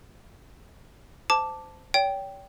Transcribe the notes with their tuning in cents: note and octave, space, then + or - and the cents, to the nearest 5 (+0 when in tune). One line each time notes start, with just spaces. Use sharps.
C5 -20 A5 +0 D6 +0
C#5 +40 G5 -5